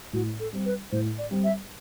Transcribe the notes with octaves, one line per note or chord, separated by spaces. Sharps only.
A2 F#4
A4
G3 C4
B4
A2 C5
D5
G3 C4
E5